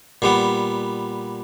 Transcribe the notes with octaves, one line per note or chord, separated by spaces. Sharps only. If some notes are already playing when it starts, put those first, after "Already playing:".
A#2 G3 B3